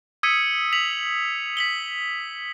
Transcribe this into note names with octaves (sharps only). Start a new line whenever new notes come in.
D#6 E6 G#6 B6 C#7 D#7
B6 F7 F#7
B6 F#7 G7